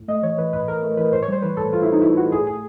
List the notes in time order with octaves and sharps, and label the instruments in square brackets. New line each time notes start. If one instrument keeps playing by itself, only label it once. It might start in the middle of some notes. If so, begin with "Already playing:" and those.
Already playing: [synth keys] A2
A3 D#5
E3 C#5
E3 B4
A2 B4
A2 A#4
A3
E3 B4
A2 C5
C#5
G3 C5
E3 B4
A2 A4
A2 F4
E4
A2 D#4
A2 E4
A2 F#4
A2 G#4
A2 G#4